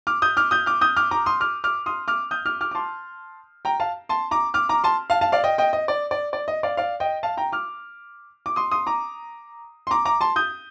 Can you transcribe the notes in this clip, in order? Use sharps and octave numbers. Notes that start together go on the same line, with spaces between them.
D6 F6
D#6 G6
D6 F6
D#6 G6
D6 F6
D#6 G6
D6 F6
A#5 D6
C6 D#6
D6 F6
D6 F6
C6 D#6
D6 F6
D#6 G6
D6 F6
D6 F6
D6
A5 C6
G5 A#5
F5 A5
A5 C6
A#5 D6
D6 F6
A#5 D6
A5 C6
F5 A5
F5 A5
D5 F5
D#5 G5
D#5 G5
D#5
D5
D5
D5
D#5
D5 F5
D5 F5
D#5 G5
F5 A5
G5 A#5
D6 F6
D6
C6 D#6
C6 D#6
A#5 D6
C6
A#5 D6
A#5 D6
A5 C6
D#6 G6